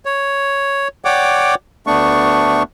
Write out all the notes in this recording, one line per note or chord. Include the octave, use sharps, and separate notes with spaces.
C#5
C#5 D5 F#5 G5 D6
D2 A3 B3 D4 C#6